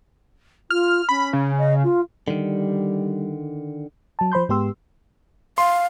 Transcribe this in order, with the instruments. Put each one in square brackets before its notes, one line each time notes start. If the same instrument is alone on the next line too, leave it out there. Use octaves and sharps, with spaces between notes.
[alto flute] F4 [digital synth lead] F6
[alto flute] C#4 [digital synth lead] B5
[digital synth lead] C#3
[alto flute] D#5
F4
[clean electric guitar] D3 D#3 [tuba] G3
[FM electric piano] F#3 A5
F3 C5 B5 C6 G6
G#2 G#3 B3 G4 C6 E6
[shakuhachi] F5 [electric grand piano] C6